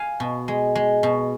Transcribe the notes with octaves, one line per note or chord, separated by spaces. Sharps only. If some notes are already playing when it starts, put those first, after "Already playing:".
Already playing: F5 G#5
B2
G#3
G#3
B2